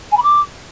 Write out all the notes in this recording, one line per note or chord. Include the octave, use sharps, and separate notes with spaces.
G#5
B5
D6